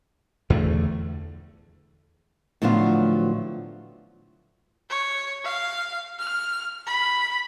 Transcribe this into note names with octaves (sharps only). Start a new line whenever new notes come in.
E2 D3 A3
A2 D3 F3 F#3 B3 F4
C#5
F5
F6
B5